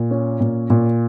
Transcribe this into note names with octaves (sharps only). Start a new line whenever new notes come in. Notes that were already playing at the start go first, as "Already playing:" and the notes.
Already playing: A#2
C#4
A#2
A#2